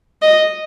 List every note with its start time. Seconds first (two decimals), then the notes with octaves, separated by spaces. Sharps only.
0.22 D#5